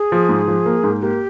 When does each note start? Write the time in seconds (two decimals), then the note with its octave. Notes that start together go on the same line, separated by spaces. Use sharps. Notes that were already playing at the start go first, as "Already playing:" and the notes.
Already playing: G#4
0.12 F3
0.29 G#2
0.48 F3
0.66 A#3
0.84 G#2
1.01 A#3 G4